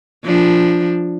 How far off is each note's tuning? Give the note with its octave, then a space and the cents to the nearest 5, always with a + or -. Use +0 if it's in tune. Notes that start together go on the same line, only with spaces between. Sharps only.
F3 +0 D4 +0